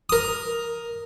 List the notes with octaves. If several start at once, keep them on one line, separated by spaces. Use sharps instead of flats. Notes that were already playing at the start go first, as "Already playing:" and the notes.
A#4 D#6